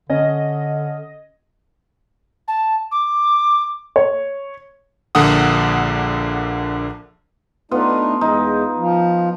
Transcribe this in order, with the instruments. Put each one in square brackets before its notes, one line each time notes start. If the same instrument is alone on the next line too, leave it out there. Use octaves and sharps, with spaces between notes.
[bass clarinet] D3 [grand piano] C#4 [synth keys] D#5
[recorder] A5
D6
[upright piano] C#5
[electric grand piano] A#1 D3 A#3 A4 F#5 D#6
[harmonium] A3 D4 D#4 [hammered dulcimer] B3 F4
[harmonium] E2 G#3 [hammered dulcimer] D#4
[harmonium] F3